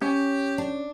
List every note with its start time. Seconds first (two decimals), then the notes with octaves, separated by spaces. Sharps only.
0.01 C#4 G4
0.58 D4